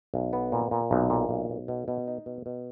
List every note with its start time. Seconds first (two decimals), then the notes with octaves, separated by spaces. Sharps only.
0.14 B1
0.33 B3
0.52 A#2
0.71 A#2
0.91 B1
1.10 A#2
1.29 B1
1.49 B1
1.68 B2
1.88 B2
2.08 D#4
2.26 B2
2.46 B2